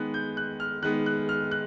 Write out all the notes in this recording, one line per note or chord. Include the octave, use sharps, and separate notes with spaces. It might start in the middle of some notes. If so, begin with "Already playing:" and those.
Already playing: D#3 G#3 B3 F#6
G6
F#6
F6
D#3 G#3 B3 F#6
F#6
F6
F#6